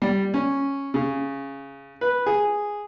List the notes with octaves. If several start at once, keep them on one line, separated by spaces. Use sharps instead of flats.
G3
C#4
C#3
B4
G#4